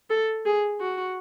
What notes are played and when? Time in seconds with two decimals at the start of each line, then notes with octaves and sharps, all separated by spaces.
0.10 A4
0.45 G#4
0.81 F#4